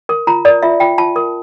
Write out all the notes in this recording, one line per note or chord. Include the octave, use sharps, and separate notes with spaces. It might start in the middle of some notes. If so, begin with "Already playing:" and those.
A#4
F4 A#5
A#4 D5
F4 E5
F4 G5
F4 A5
A#4